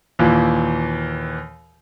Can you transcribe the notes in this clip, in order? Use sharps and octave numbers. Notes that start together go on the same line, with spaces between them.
D#2 A#2 E3